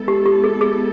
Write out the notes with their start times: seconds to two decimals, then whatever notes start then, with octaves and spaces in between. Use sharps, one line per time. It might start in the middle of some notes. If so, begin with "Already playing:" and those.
Already playing: G#3 B3 E4 A4
0.08 G4
0.26 G4
0.44 G#4
0.61 G#4